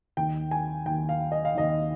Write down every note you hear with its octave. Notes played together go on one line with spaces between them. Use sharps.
D#2 D#3 G5
G#5
D#2 D#3 G5
F5
D#5
F5
D#2 D#3 D#5